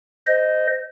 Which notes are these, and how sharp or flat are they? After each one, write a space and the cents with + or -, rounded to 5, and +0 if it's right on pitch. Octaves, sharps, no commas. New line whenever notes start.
C5 -20 D#5 -5